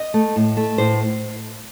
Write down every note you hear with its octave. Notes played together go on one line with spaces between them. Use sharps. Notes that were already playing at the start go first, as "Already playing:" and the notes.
Already playing: D#5
A3
A2
A3
A2 C5